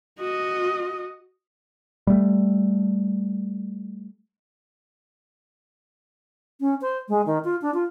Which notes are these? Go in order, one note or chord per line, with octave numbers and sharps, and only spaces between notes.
F#4 D#5
G3 A3
C#4
C5
G#3
D#3
F4
D4
F4